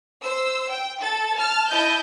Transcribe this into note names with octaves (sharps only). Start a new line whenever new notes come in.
C5 E6
G5
A4 A6
A5 F6
E4 D#5 A5 G6